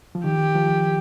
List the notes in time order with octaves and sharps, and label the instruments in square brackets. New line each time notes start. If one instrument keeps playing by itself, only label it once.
[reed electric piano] F3
[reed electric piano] D#3 [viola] G4
[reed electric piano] F3